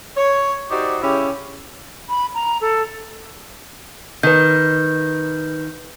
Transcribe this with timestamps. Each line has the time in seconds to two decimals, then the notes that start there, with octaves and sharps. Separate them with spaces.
0.17 C#5
0.69 D#4 F#4 G4 C5 D5
1.02 C#3 C#4 E4 G4
2.09 B5
2.34 A#5
2.61 A4
4.23 D#3 B4 G6